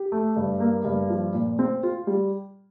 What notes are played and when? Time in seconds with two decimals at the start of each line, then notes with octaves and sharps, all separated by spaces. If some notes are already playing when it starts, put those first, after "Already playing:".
Already playing: G4
0.12 A3
0.36 G2
0.60 A#3
0.85 G2
1.10 F3
1.34 A#2
1.59 C4
1.83 F4
2.07 G3